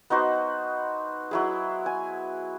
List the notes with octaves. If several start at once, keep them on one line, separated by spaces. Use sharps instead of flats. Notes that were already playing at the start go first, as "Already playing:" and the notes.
B3 D#4 F#4 C5
F#3 E4 G#4
G#5